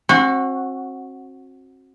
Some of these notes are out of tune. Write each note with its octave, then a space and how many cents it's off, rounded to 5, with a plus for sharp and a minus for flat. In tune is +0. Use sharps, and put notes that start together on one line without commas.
C4 +35 F#4 -10